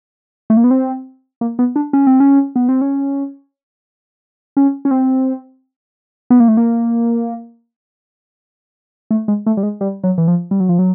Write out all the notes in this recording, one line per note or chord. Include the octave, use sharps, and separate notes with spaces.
A3
A#3
B3
C4
A#3
B3
D4
C#4
C4
C#4
B3
C4
C#4
C#4
C#4
C4
B3
A#3
A3
A#3
A3
G#3
A3
G3
G#3
G3
F#3
E3
F3
G3
F#3
F3
F#3